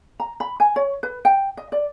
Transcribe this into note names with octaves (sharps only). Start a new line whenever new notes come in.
A#5
B5
G#5
C#5
B4
G5
D#5
D5